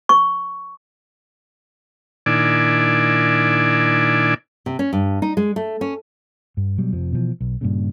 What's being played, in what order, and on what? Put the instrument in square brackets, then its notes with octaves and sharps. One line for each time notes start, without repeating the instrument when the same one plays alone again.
[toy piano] C#6
[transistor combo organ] A#2 D#3 D4 E4 D5 G#5
[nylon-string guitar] C3
C#4
G2
D#4
G#3
A3
C#4
[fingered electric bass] G2
B2 F#3 G3
F1 F2 F3
B2 E3 F3
B1
G2 A#2 C#3